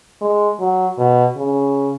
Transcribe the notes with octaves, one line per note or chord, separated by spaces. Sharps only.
G#3
F#3
B2
C#3